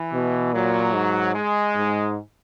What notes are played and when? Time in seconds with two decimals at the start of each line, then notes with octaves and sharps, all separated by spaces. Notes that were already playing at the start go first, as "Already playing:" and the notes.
Already playing: E3
0.13 B2
0.54 A#2 F#3
0.94 G#2
1.35 G#3
1.75 G#2